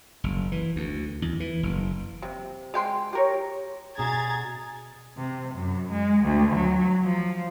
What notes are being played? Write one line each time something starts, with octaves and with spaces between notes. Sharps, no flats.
F#1
E3
D2
E2
E3
F#1
C3
G#3 G5 C6
G4 A#4 C#5
B2 D4 G#4 A#5 G#6 A6
C3
F#2
G#3
D2
F#3
F3